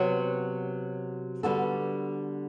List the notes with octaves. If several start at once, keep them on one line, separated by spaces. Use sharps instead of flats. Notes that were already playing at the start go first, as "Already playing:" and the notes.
Already playing: C3 F#3 B3 F#4
D3 G3 B3 F#4 A4